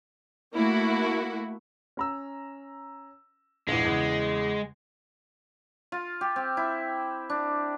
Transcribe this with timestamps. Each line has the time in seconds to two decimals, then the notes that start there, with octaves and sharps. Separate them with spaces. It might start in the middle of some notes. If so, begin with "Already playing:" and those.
0.55 A3 A#3 E4 F#4
1.97 C#4 A#5 E6
3.68 A#1 E2 G#3
3.85 E2 C#3
5.92 F4
6.21 G4
6.36 C4
6.57 E4
7.30 D4